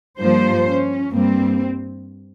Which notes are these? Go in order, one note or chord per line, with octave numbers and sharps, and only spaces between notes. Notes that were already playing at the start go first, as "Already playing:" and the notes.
G2 F3 A#3 C5
C#4
G2 G3 A#3 C4